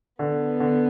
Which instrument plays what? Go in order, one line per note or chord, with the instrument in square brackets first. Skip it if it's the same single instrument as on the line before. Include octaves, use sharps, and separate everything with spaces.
[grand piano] D3 [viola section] B3
[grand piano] D3